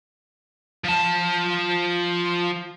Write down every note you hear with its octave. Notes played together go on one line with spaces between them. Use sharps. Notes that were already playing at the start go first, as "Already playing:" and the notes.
F3 A5